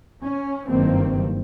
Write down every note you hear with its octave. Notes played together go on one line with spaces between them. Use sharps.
C#4
F#1 G2 D#3 A#3 C4